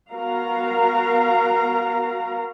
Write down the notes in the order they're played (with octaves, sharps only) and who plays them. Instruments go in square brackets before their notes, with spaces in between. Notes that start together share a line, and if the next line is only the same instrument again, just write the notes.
[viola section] B3 F#4 A#4 F5 A#5